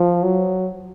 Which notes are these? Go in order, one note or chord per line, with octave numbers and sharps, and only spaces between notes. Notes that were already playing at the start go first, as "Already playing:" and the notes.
Already playing: F3
F#3